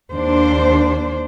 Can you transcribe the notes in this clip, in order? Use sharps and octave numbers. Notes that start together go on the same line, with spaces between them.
D#2 D4 C5